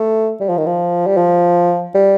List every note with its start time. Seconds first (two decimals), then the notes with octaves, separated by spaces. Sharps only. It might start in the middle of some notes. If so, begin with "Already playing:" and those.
Already playing: A3
0.40 G3
0.49 F3
0.58 D#3
0.67 F3
1.07 G3
1.17 F3
1.95 G3